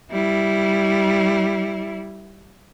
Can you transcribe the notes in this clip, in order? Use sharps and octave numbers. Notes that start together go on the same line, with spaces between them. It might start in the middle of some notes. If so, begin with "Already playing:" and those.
G3 E4